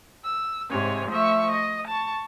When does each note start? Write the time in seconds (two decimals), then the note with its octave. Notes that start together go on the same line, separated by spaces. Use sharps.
0.24 E6
0.70 G#2 C3 C#5 G#5
1.10 F3 A3 E5 C#6
1.51 D#5
1.88 A5 C#6